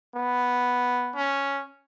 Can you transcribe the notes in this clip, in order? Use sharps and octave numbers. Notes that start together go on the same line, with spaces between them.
B3
C#4